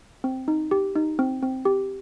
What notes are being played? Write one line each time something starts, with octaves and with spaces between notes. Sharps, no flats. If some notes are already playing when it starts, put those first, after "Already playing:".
C4
D#4
G4
D#4
C4
C4
G4